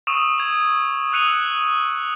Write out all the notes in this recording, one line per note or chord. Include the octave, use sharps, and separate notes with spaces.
C#6 D#6 E6 D#7 E7
G#6 F7
D#6 E6 F#6 C#7 D#7 F7